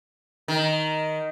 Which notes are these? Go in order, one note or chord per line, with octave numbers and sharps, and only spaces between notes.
D#3